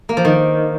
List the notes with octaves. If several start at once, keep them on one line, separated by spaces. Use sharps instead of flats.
A#3
F3
D#3